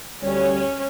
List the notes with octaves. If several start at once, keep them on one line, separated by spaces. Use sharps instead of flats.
D2 G3 C#4 C#5